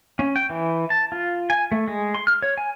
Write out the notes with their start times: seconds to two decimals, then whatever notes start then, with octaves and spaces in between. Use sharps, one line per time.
0.19 C#4
0.36 G5
0.50 E3
0.90 A5
1.12 F4
1.50 G#5
1.72 A3
1.88 G#3
2.15 C6
2.27 F6
2.42 C#5
2.58 G#5